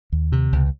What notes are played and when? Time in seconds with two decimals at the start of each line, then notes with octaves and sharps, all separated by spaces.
0.12 D#2
0.32 C3
0.53 C#2